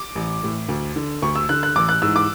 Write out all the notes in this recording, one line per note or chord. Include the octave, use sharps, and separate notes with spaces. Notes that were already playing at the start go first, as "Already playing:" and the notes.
Already playing: D6
A1
A2 E3
D2
D3
D2 C#6
E6
D3 F#6
F#6
A1 D6
F#6
G#2 E3 E6
D6